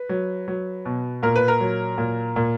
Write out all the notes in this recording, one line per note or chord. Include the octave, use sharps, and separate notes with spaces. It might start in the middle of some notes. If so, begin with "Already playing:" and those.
Already playing: B4
F#3
F#3
B2
A#2 A#4
B4
A#4
F#3
A#2
A#2